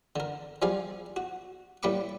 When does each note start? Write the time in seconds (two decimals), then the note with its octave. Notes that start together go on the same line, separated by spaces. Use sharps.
0.16 D3 A#4
0.62 F3 G3 G#4 F5
1.16 F#4
1.83 A2 G3 A#3 B5 C#6 D6